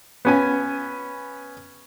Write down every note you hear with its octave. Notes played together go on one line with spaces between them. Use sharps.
B3 C#4 G#5